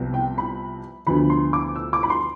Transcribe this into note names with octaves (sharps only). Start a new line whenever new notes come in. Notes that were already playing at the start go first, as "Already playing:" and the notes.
Already playing: C2 C3 F3 B3
G5
B5
D2 D3 F3 B3 B5
C6
D6
E6
D6
B5
C6